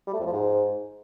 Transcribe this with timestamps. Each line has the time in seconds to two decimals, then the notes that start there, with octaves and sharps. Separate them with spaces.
0.07 G3
0.13 A3
0.20 F2
0.26 F3
0.32 G#2